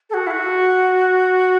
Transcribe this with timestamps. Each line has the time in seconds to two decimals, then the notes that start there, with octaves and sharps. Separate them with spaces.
0.10 A4
0.14 F#4
0.27 E4
0.31 F#4